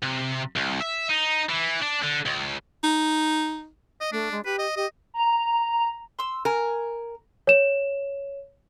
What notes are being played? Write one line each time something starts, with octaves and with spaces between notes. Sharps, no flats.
C3
C2
E5
D#4
E3
D4
D3
C#2
D#4
D#5
A3 D4
G#3
G4 B4
D#5
G4 D#5
A#5
C6 E6
A#4 G#5
C#5 E7